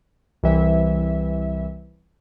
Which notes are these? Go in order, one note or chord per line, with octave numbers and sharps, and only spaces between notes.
C2 E3 E5